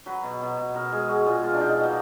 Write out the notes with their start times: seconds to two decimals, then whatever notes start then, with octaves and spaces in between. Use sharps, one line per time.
0.06 F#3 B4
0.23 B2
0.41 B2
0.58 B2
0.75 B2 A#4
0.92 G#3 G#4
1.09 G#3 F#4
1.26 A#2 F4
1.43 B2 F4
1.53 D4
1.60 B2 D#4
1.78 F#3
1.83 A#3